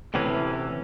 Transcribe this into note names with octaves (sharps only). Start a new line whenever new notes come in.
D2 A2 C3 E3 C#4